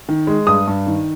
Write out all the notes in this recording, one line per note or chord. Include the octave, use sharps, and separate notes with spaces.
D#3
G#3
G2 D#6
G2
D#3